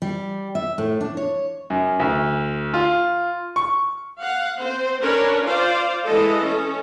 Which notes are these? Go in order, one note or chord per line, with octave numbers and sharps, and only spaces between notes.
G3
E5
A2
D4
C#5
F#2
D2
F4
C#6
F5 F#5
C4 C5
C#4 D4 A#4 B4 C#5
F4 C5 D5 F5
E3 G#3 A4 D#5
C#4 A4